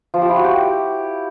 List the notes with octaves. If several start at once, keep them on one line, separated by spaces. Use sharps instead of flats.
F3
G4
E4
F#4
G4